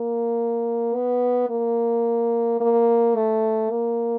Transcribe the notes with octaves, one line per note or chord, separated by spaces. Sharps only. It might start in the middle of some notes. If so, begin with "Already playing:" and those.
Already playing: A#3
B3
A#3
A#3
A3
A#3